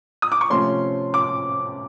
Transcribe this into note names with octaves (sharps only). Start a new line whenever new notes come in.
D#6
D6
C#6
C3 F3 A3 C#4 C6
D6